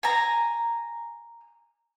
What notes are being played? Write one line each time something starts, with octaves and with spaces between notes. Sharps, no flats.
G#5 A#5